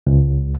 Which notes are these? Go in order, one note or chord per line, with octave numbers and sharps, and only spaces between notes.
C#2